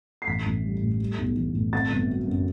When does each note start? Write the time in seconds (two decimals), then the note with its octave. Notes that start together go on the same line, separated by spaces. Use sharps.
0.22 C7
0.27 A1 B6
0.46 A1
0.64 G3
0.82 A2
1.00 G3
1.18 B1
1.37 E3
1.54 A2
1.73 C4 A6
1.90 G1
2.09 F#3
2.27 F#2